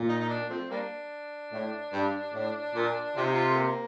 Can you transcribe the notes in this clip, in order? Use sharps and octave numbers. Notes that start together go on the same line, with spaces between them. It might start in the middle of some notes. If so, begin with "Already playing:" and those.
Already playing: A#2
D#4
D#4
D4
F3 A3 C4
G3 A#3 D4
A2
G2
A2
A#2
C3 F4
D#4
F4
A3
A#3